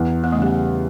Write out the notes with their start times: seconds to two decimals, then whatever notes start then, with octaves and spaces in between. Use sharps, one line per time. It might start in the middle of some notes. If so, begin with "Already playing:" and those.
Already playing: E2
0.24 B3
0.32 A3
0.38 C#3 G3 B3